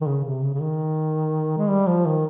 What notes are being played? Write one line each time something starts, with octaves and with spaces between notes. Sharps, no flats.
D#3
C#3
C3
C#3
C#3
D#3
G#3
G3
F3
D#3